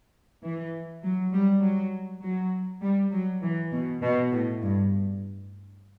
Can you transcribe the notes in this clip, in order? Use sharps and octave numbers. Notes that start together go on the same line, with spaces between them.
E3
F#3
G3
F#3
F#3
G3
F#3
E3
B2
B2
A2
G2